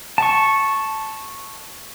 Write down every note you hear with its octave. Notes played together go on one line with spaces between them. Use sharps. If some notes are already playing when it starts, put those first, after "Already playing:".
A5 C#6